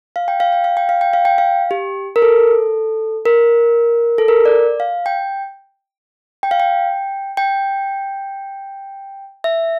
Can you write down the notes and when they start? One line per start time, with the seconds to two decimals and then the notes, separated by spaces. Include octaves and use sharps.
0.16 F5
0.28 G5
0.40 F5
0.53 G5
0.64 F5
0.77 G5
0.89 F5
1.01 G5
1.13 F5
1.25 G5
1.38 F5
1.71 G4
2.16 A#4
2.22 A4
3.26 A#4
4.18 A4
4.28 A#4
4.45 D5
4.80 F5
5.06 G5
6.43 G5
6.51 F5
6.60 G5
7.37 G5
9.44 E5